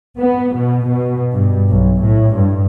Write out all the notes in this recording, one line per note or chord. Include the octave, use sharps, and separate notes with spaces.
B3
B2
B2
G2
B1
A2
G2